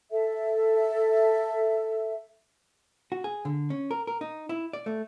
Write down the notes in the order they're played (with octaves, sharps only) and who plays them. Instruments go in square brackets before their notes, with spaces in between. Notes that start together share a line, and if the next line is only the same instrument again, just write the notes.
[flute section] A4 E5
[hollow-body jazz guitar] F#4
G#4
D3
C#4
A#4
A#4
D#4
E4
D5
A3